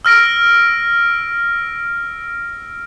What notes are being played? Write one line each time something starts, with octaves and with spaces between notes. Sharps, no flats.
E6 F6 A#6 D7